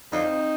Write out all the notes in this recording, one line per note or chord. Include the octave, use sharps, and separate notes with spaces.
F2 D3 F3 C4 D#4